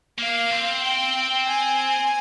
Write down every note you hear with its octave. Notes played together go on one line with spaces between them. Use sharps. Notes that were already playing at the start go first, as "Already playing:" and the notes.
A#3 F5
C4
G5
G#5